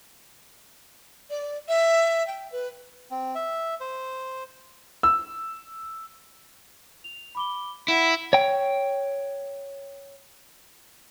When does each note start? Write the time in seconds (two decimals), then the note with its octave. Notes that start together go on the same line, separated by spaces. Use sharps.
1.30 D5
1.68 E5
2.27 G5
2.52 B4
3.11 C4
3.35 E5
3.81 C5
5.03 E6
7.04 F7
7.35 B5 D6 G7
7.88 E4 E5 F#5 B5
8.33 C#5 G5